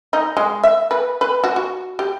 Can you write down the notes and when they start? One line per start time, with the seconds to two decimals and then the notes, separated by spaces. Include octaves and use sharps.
0.13 D#4
0.37 G#3
0.63 E5
0.91 B4
1.21 B4
1.44 F#4
1.56 F#4
1.99 G4